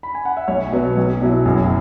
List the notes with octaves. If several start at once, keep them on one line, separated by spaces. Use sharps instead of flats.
B5
G#5
F#5
E5
B1 C#5
B2 F#3 B3
B1
B2 F#3 E4
F#1 G#4